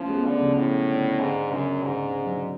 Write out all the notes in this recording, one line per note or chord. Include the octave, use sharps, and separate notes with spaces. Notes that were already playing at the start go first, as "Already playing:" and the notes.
Already playing: F3 A3 C#4
G#3 B3
D3
C#3 F3
A2
D3
G#2 D3
F#2 C#3
G#2 D3
D3
D3 F#3